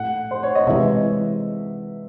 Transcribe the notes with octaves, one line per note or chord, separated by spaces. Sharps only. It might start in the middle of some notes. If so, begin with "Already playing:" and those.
Already playing: A2 F#5
C5
C#5
D#5
C3 E3 G#3 E5